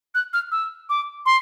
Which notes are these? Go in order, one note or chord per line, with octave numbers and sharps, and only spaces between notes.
F#6
F6
E6
D6
C6